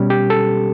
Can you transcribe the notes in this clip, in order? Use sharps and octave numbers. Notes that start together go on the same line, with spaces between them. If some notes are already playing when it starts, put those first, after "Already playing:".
Already playing: B2 G3 C#4
G4
A4